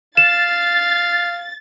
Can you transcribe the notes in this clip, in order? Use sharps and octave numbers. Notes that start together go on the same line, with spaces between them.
F5 A6 E7